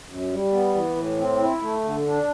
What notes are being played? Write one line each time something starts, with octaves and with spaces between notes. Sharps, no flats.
F#2
G3
B3
E3
A2
C4
E4
A3
D3
D4